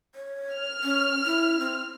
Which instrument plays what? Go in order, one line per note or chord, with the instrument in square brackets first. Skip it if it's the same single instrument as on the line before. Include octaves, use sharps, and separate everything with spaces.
[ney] C#5
[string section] F6
[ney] C#4
E4
C4